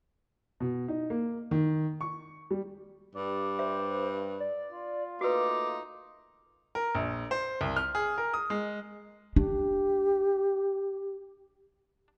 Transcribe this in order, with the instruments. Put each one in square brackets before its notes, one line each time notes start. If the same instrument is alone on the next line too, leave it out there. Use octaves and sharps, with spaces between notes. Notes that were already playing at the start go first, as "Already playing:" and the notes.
[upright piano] B2
D#4
A#3
D#3
C#6
G3
[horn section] G2 [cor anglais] D5
[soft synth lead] C5 [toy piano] E5
[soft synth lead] D5
[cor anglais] F4
[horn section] A3 A#3 D#4 [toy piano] F#4 B4 [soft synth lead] D6
[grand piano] A#4
A#1
C5
C2
F6
G#4
A#4
D#6
G#3
[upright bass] D4 [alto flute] G4